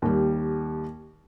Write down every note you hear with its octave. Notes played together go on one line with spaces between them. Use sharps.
D#2 G3